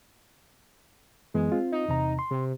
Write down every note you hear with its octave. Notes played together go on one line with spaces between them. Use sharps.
F#2 E3 G#3 B3
C4 F4
D#4
E2 C3 A#5
C6
C3